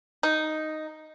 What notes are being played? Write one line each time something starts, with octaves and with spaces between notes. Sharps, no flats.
D#4